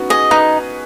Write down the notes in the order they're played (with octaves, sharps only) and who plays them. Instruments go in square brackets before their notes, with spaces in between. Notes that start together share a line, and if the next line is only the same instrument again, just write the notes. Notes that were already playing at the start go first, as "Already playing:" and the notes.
Already playing: [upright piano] B3 C#4 D#4 F#4
[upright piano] G#4 [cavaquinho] D#5
[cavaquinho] D#4 [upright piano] B4